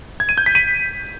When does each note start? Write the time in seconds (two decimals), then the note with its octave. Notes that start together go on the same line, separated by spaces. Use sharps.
0.20 G#6
0.29 D#7
0.38 G6
0.46 B6
0.55 D#7